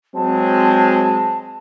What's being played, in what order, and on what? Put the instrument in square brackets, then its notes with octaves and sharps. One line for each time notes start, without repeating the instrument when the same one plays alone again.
[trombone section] F#3 G#3 C4 [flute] A5